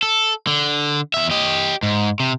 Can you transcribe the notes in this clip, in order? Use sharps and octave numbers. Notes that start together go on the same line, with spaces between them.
A4
D3
E2 E5
G4 D#5
G#2
C3